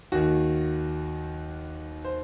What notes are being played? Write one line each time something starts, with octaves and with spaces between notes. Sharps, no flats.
D#2 D#3 F#4
C5